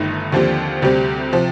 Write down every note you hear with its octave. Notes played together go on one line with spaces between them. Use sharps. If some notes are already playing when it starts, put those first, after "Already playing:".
Already playing: G1 G2 D#3 A3 D#4
D#2 D3 F3 C4 G4
D2 C3 G3 C4 G4
C3 F3